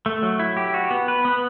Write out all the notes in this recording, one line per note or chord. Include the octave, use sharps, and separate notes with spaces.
A3
F#3
E4
G4
F#4
B3
B4
B3